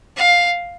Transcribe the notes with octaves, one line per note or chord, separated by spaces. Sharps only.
F5